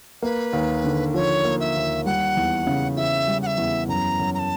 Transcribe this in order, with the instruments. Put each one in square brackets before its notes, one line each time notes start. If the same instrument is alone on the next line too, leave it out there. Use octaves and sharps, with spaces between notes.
[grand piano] A#3 [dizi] B4
[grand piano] D#2
D3
[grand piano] F3 [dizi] C#5
[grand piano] A#3
[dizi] E5
[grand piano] D#2
[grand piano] G3 [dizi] F#5
[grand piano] E2
C#3
[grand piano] E3 [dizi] E5
[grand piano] G3
[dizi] F#5
E5
[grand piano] E2
[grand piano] F#2 [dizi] A#5
[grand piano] F#2
[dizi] A#5
A5